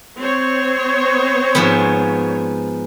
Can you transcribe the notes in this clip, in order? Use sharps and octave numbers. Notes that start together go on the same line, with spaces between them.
C4 C5 C#5
G#2 F3 B3